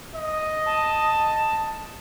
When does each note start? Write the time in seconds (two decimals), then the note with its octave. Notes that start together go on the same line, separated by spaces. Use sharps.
0.15 D#5
0.66 A5